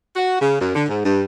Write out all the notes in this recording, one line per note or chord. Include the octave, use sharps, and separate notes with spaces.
F#4
C#3
F#2
D3
G#2
G2